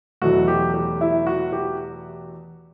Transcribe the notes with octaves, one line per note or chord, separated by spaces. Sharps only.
E2 B2 F#3 A3 F#4
G4
G4
E4
F#4
G4